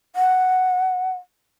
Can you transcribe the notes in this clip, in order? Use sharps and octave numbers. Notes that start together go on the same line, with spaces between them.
F#5